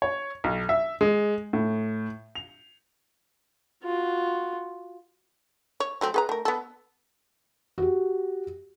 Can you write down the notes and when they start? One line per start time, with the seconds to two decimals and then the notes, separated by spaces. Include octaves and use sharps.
0.02 C#5
0.44 B1
0.69 E5
1.01 G#3
1.53 A2
2.35 F7
3.83 F4 F#4
5.80 C#5
6.01 F#3 A3 C4
6.14 G#4 B4 A#5
6.29 A3 A#4
6.45 B3 A4
7.78 F#4 G4